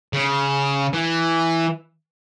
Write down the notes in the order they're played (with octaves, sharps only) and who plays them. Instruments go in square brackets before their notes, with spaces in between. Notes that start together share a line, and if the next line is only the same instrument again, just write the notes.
[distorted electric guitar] C#3
E3